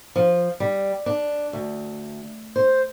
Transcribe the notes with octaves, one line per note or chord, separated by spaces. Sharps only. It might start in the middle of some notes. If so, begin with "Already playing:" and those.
F3
G3
D4
D2
C5